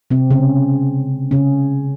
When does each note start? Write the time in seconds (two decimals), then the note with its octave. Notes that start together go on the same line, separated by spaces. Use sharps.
0.11 C3 C4
0.31 C#3 C#4
1.31 C#3 C#4